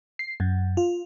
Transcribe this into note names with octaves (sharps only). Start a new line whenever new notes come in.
C7
F#2
F4